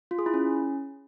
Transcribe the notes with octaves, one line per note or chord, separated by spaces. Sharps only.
F4
G#4
E4
C#4